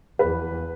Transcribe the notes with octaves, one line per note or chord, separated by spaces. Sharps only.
E2 B4